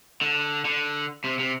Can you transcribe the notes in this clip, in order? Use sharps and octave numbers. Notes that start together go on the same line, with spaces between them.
D3
D3
C3
C3